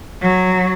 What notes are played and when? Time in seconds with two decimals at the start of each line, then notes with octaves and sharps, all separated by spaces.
0.22 F#3